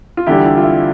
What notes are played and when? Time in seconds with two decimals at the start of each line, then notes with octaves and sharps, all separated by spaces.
0.17 F4
0.26 E2 D3 G3 E4 G4
0.45 F4
0.58 F4
0.63 E4